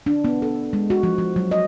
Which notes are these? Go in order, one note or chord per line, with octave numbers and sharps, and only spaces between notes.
D4
B3
A4
G#3
F#4
F3
F3
F#3
D#5